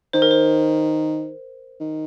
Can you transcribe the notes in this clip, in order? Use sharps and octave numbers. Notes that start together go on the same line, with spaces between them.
D#3 C5
A#4
C5
D#3